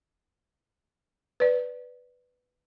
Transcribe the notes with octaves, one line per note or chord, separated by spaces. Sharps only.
B4 D5